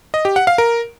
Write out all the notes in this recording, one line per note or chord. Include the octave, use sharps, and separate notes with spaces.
D#5
G4
F#5
F5
A#4